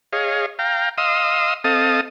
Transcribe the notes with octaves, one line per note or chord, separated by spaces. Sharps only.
G#4 C#5 D#5 F5
F5 G5 A#5
D#5 F5 C6 D#6 E6
C4 A4 D#5 F5 A5 D#6